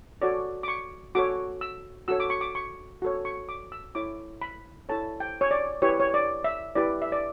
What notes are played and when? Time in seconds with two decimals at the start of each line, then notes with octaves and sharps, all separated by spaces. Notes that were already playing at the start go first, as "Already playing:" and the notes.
0.22 F#4 A4 C#5 D5
0.63 D6
0.68 C#6
1.15 F#4 A4 C#5 D6
1.61 E6
2.08 F#4 A4 C#5 E6
2.20 D6
2.30 C#6
2.41 D6
2.55 C#6
3.02 F#4 A4 C#5
3.25 C#6
3.49 D6
3.72 E6
3.95 E4 A4 C#5 D6
4.42 B5
4.89 E4 A4 C#5 A5
5.20 G5
5.41 C#5
5.51 D5
5.82 E4 G4 B4 C#5
6.00 C#5
6.14 D5
6.44 E5
6.75 E4 G4 B4 D5
7.02 E5
7.12 D5